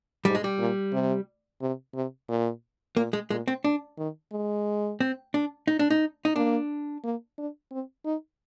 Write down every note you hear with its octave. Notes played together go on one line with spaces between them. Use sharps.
G#2 G3
G#3
G3
A#2
C3
C3
C3
A#2
A#2 A#3
G#3
A#2 G#3
C4
D4
D#3
G#3
C4
D4
D#4
D4
D#4
D#4
A#3 D4
A#3
D4
C4
D#4